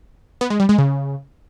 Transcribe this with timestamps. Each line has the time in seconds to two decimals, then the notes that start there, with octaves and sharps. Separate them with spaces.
0.41 B3
0.50 G#3
0.60 G3
0.69 G#3
0.78 C#3